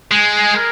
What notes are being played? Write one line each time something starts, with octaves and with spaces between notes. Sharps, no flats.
G#3 G#5
A#4